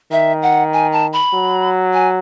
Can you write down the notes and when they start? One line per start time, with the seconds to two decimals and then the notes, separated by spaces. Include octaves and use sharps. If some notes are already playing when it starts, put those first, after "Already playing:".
0.12 D#3 E5
0.42 F#5
0.73 G#5
0.92 A5
1.13 B5
1.33 F#3
1.94 G#5